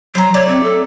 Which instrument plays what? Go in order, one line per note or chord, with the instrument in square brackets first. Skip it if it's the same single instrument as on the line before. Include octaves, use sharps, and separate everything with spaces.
[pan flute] F#3 [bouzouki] C5 A#5
[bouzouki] A3 D5 [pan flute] C#5
[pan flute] C4
A4